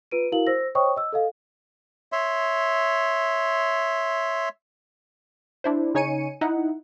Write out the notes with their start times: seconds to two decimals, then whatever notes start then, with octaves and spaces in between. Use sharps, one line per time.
0.11 F4 B4 D7 D#7
0.32 E4 F#4 A#4 F5 F#7
0.47 C5 E6 A#6
0.75 C5 C#5 D#5 G5 C#6 D#6
0.96 D#5 E6
1.13 A4 D#5 F5
2.12 C#5 E5 C6
5.64 D4 E4 C5
5.94 C#3 D#4 C#5 G#5 C#7 D#7
6.41 D#4 E4 F#5